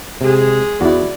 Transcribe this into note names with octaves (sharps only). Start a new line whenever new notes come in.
C3 G#3 G#4
E2 E4 F#4 D5